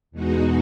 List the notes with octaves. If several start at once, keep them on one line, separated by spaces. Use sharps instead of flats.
E2 B2 G#3 D#4 F#4